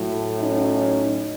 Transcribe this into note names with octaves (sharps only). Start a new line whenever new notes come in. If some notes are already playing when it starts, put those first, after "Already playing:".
Already playing: A2 F#3
C#4 D#4